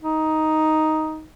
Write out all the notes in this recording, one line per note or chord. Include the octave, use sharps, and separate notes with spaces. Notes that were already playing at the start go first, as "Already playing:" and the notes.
D#4